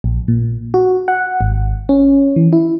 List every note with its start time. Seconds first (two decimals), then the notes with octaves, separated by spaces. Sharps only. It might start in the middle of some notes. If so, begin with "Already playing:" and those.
0.04 A#1
0.28 A#2
0.74 F#4
1.08 F#5
1.41 G#1
1.89 C#4
2.36 E3
2.53 E4